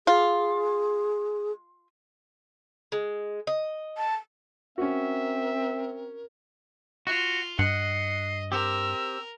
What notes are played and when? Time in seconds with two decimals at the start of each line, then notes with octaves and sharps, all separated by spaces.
0.07 F4 G#4
2.92 G#3
3.47 D#5
3.98 A5
4.78 C4 C#4 F#4 A#4 E5
7.07 F4 F#4
7.59 G2 D#5 F#5 C7
8.52 C4 G4 A#4 E6